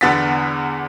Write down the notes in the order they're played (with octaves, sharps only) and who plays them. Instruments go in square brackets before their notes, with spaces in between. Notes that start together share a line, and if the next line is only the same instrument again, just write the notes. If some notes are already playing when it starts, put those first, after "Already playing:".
[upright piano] E2 D3 B3 A6 B6